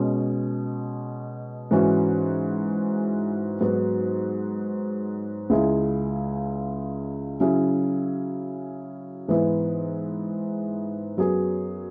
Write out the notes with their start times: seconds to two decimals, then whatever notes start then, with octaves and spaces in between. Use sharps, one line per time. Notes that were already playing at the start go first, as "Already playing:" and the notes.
Already playing: B2 G#3 C#4
1.71 G#2 E3 C#4 F#4
3.61 G#2 F#3 B3 F#4
5.50 C#2 C#3 G#3 E4 G#4
7.40 C#3 F#3 C#4 E4 G#4
9.28 G#2 E3 B3 E4
11.17 F#2 F#3 B3 G#4